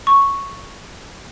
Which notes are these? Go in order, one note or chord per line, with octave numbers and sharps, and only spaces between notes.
C#6